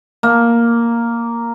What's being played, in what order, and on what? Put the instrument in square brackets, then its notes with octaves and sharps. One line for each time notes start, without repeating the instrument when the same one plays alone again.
[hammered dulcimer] A#3